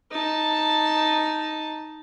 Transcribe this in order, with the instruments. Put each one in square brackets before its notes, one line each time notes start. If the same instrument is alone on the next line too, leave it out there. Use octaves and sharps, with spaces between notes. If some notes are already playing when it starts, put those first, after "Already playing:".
[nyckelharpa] D#4 A5